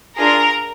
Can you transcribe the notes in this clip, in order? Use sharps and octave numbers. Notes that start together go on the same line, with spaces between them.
D4 F4 G#4 A#4 A#5